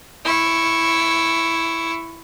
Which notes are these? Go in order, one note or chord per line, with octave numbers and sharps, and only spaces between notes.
E4 C#6